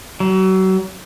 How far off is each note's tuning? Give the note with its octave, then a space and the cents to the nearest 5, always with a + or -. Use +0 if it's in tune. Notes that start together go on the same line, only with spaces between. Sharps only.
F#3 +35